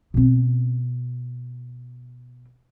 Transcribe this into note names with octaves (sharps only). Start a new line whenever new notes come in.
B2 C4